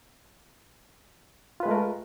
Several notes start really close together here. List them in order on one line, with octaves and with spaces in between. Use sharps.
F4 B4 G#3 A3 A#4